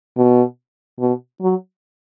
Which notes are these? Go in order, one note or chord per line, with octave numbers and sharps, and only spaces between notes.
B2
B2
F#3